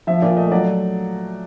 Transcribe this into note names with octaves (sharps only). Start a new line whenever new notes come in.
F3 E5
A#2 D5
A3 D#5
F#3 D5